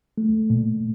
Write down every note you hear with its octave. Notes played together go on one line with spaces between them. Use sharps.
A3
A#2